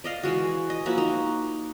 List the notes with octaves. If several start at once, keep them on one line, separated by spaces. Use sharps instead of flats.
D5 D#5 F5
E3 G#3 F#4
D#5
F3 A#3 E4 F#4
D#4